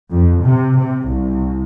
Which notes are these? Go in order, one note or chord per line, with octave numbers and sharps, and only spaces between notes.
F2
C3
C3
C2